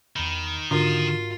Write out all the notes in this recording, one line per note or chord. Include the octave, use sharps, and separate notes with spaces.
E2 D#3 A#5 B5
G#2 D3 F4 F#4 A#4